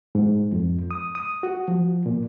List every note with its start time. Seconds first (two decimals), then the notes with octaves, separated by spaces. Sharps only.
0.15 G#2
0.52 F2
0.91 D#6
1.15 D#6
1.43 F#4
1.68 F3
2.06 A#2